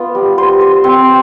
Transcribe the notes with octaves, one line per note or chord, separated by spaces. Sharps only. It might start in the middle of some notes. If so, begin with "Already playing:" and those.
Already playing: B3 F4
G3
C5
C5
C4